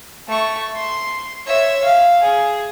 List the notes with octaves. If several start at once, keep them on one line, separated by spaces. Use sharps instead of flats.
A3 C#6
C6
C#5 E5
F5
G#4